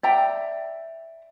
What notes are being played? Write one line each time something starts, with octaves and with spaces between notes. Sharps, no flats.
D5 E5 G5 A#5